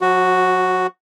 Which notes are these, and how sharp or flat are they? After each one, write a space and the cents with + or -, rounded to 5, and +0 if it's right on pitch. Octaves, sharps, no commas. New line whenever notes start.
F#3 -45 F#4 +0